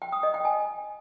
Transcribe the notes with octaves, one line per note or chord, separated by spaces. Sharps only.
G5
D#6
D#5
G5
G#5